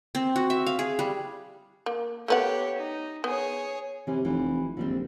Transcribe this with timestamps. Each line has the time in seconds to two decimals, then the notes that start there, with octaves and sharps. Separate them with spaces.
0.15 C4
0.36 F#4
0.50 E5
0.67 F5
0.79 G#4
0.99 G3
1.86 A#3
2.28 A3 B3 G4 C#5 F#5
2.77 D#4
3.24 B3 G#4 C#5
4.07 C3 E3 C#4
4.25 F1 E3
4.77 A#1 D3 G3 C4